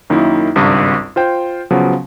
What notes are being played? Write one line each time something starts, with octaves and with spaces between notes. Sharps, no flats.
F#2 D#3 A#3 D#4 E4
G#1 C#2 G2
F4 C5 G5
C#3 F3 F#3 B3